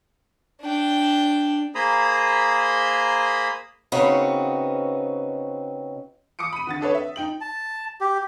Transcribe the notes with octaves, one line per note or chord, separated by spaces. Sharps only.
D4 G5
A#3 G#4 C5 A#5 B5 D#6
C#3 B3 C4 D#4 F#4
D6 D#6 C#7 D7
B5 D#7
D3 F#5 A6
D4 A4 B4 C#5
E5
D#4 G5 F#7
A5
G4